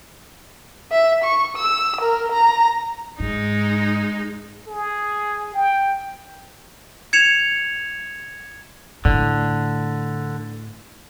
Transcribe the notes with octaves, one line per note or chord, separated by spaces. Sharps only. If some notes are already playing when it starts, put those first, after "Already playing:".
E5
C#6
E6
A#4
A#5
G#2 G#3 D#4
G#4
G5
G#6 C#7 E7 F7
A2 D3